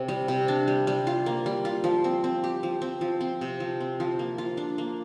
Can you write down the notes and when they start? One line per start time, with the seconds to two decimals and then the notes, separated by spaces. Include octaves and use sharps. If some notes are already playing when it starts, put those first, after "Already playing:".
Already playing: C3
0.08 G3
0.28 C3
0.48 D4
0.68 G3
0.87 G3
1.07 F4
1.26 A#3
1.46 G3
1.65 F4
1.84 F3
2.04 C4
2.24 C4
2.44 G4
2.63 F3
2.82 C4
3.01 F3
3.21 C4
3.41 C3
3.60 F3
3.80 C4
4.00 F3
4.19 A#3
4.38 F4
4.57 D4
4.78 A#3